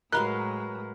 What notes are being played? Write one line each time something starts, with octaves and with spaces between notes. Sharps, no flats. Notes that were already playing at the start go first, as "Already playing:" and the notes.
A2 F#3 G#3 A#4 B4 F5 C6 F#6